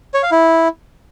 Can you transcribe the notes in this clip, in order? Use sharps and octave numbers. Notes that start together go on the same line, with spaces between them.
C#5
F5
E4